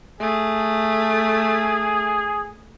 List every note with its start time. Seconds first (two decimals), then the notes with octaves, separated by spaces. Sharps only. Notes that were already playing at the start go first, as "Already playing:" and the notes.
0.20 A3 G#4